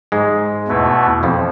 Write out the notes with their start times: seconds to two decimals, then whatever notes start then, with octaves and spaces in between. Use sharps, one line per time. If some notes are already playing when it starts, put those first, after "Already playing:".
0.12 G#2 G#3
0.68 E2 B2 A3 E4 B4
1.23 F2 F3